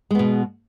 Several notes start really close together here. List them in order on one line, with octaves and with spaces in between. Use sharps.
G#3 B3 B2